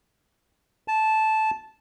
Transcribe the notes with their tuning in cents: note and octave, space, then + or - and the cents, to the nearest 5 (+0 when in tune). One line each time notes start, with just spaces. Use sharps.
A5 -10